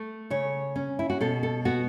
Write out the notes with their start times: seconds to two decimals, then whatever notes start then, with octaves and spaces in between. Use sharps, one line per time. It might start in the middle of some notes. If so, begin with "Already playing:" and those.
Already playing: A3
0.30 C#3 C#5
0.76 C#4
0.99 E4
1.10 F#4
1.21 B2 A4
1.43 A4
1.65 B3 F#4